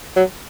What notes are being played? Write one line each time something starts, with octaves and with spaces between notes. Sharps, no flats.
F#3